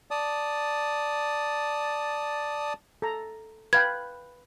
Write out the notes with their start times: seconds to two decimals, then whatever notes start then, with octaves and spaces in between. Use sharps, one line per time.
0.11 D5 A5 D#6
3.02 A4 A#5
3.73 B4 F5 G5 G#6